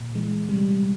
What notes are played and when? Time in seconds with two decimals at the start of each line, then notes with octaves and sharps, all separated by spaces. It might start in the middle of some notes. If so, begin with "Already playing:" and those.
Already playing: A#2
0.15 E3 G#3
0.49 C3 G3